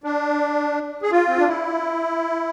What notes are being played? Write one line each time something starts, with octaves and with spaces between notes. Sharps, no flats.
D4
G#4
F4
C4
D4
E4